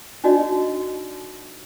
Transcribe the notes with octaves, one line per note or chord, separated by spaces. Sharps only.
D4 D#4 F#4 D5 D#5